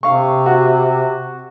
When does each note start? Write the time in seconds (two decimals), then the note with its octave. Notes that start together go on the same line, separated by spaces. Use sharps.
0.03 C3 F5 C#6
0.46 F#4